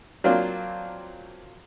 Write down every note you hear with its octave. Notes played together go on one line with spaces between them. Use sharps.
F#3 A#3 C4 D4 F4